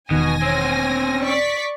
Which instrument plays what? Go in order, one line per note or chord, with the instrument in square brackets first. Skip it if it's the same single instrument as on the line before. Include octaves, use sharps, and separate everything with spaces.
[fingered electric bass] E1 D#3 [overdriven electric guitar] B2 [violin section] G#5 A#6
[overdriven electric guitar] C4 C#4
[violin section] D5 C#6 B6